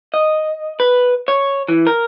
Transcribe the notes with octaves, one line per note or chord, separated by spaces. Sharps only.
D#5
B4
C#5
E3
A#4